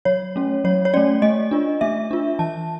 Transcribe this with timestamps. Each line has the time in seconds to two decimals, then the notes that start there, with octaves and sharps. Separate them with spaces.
0.05 F#3 C#5
0.36 A3 C#4
0.64 F#3 C#5
0.85 C#5
0.94 A3 C#4 D5
1.22 A3 D#5
1.51 D4 F4
1.81 A3 E5
2.11 D4 F4
2.39 E3 A5